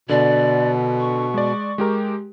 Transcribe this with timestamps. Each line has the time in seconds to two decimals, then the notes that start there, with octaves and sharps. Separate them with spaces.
0.09 B2 D3 D5
1.00 C#6
1.34 G#3 D5
1.78 G#3 G4 A#4